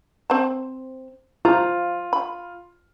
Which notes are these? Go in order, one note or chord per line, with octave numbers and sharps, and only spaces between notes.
C4 A5
F3 F4 A#5
B5